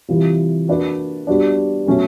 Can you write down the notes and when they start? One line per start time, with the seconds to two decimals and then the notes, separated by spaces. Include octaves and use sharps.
0.08 C3 E3 G3 C4 F4
0.68 A#3 D4 F#4 B4 D5
1.27 G3 B3 D4 F#4
1.86 B2 F#3 A3 C#4